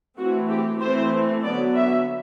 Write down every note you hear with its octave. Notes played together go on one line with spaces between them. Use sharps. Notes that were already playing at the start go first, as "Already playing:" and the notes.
E3 A3 C4 F#4
G4
E3 A3 C4 C5
D3 F#3 B3 D5
E5